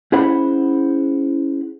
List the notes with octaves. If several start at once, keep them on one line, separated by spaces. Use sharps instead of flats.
C#4 E4 G#4 C5 F#5 B5